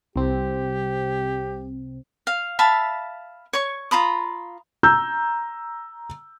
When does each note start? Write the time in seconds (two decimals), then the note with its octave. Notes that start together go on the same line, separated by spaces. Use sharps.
0.16 C2 C4 G4
2.27 F5
2.59 E5 F5 A5 B5
3.53 C#5 C#6
3.91 F4 A#5 B5 D#6
4.83 A#5 E6 G6